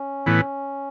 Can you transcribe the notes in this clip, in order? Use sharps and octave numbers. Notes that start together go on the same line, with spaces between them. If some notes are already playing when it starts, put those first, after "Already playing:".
Already playing: C#4
A2 E3 B3